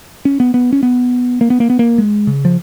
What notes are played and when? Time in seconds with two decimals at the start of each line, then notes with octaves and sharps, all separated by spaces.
0.25 C#4
0.40 B3
0.54 B3
0.73 C#4
0.83 B3
1.41 A#3
1.50 B3
1.60 A#3
1.70 B3
1.79 A#3
1.98 G#3
2.27 C#3
2.45 F3